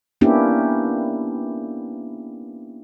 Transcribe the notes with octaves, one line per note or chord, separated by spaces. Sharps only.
A#3 B3 C#4 D4 E4 G4